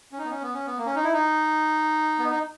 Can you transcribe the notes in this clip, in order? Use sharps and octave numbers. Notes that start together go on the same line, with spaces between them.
C#4
D#4
B3
C#4
B3
C#4
B3
A#3
C#4
D#4
E4
D#4
B3
D#4